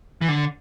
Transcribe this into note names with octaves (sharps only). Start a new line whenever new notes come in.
E3
D3